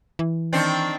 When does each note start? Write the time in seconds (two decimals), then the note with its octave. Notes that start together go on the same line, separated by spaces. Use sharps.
0.19 E3
0.53 D#3 C4 D4